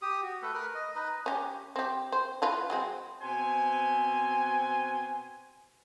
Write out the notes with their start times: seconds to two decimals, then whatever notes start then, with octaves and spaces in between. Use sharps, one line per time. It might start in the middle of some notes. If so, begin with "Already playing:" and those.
0.02 G4 D#6
0.22 F#4
0.42 A3 A4 B4
0.54 A#4 B4
0.75 D#5
0.95 D#4 B4 D#5
1.26 C#4 G4
1.76 C4 G4
2.12 C5
2.42 E3 F4 B4
2.70 F#3 G#3 C4
3.21 B2 C4 C5 G#5